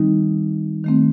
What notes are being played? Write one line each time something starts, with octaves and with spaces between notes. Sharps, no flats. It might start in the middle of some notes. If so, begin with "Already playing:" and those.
Already playing: D#3 G3 C4 D#4
D#3 A3 C4